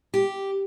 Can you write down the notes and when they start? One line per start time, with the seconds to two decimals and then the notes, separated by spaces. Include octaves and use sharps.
0.14 G4